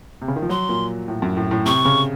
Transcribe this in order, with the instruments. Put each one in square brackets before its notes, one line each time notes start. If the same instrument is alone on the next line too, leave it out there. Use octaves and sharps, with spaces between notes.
[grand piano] C3
C#3
D#3
F3
[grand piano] F#3 [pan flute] C6
[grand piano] A#2
A2
F#2
A2
A2
[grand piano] C3 [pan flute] C#6
[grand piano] C#3